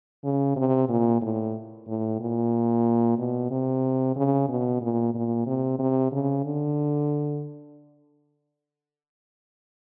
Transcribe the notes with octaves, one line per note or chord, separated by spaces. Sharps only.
C#3
C3
A#2
A2
A2
A#2
B2
C3
C#3
B2
A#2
A#2
C3
C3
C#3
D3